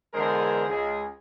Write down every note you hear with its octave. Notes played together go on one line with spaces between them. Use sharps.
E2 D3 G#3 G#4 A#4 C5
C#2 G#4